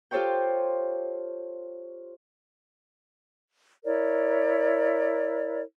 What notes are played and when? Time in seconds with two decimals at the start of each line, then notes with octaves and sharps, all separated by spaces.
0.11 F4 G4 A4 C5 C#5 G5
3.85 E4 A#4 C#5 D5